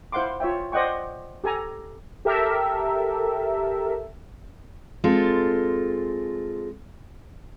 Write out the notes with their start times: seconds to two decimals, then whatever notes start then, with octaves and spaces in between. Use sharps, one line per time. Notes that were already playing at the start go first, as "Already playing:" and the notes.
0.12 E4 C5 F5 F#5 C6 D6
0.40 F4 C#5 E5 G5
0.72 C5 D5 D#5 F#5 G5 C#6
1.44 G4 A4 G#5 A#5
2.25 G4 A4 A#4 E5
5.04 G#3 C4 F4 A4